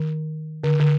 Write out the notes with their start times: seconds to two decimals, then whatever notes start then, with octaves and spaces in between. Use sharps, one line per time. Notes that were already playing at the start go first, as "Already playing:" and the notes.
Already playing: D#3
0.64 D3
0.80 D3